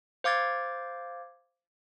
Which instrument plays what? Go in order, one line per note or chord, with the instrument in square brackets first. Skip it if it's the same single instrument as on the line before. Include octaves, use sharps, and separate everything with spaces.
[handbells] C5 F5 D6 G#6 A6